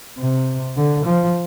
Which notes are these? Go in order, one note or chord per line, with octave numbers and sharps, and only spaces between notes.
C3
D3
F3